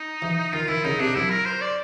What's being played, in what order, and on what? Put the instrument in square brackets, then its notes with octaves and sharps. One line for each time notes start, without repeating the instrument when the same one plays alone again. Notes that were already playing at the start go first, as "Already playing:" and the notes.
Already playing: [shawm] D#4
[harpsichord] E3
[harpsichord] D#3 [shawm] F4
[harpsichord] D#3 [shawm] E4
[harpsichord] C#3 [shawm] D#4
[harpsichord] C3 [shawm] D4
[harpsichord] F#2 [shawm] E4
[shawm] A#4
C5
D5